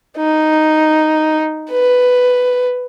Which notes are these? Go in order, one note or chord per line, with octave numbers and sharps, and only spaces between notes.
D#4
B4